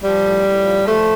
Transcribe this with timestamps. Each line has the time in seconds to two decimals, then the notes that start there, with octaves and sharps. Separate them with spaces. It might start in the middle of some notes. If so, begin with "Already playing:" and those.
0.02 F3 G3
0.22 A2
0.43 A2
0.62 F3
0.83 F3 A3